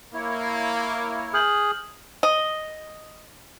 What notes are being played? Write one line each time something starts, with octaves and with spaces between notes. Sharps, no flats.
A#3 E4 C#5
G#4 F6 G6 F#7
D#5